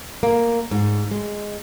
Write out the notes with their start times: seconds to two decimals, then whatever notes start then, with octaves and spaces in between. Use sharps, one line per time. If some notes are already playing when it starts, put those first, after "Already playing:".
0.23 A#3
0.71 G#2
1.11 G#3